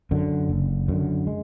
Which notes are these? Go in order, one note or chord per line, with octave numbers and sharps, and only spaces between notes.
F#2 D3
F#1
F#2 D3
G#3